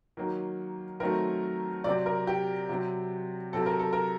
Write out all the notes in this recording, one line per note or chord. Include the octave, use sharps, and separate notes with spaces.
D#3 F#3 A#3
D#3 F#3 A3 C4 A#4
C3 F#3 C4 D5
A#4
G4
C3 F#3 C4
C3 F#3 C4 A4
A#4
A4
A#4